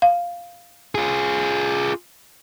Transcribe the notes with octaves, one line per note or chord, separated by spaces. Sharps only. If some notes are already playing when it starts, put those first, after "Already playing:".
F5
F4 G#4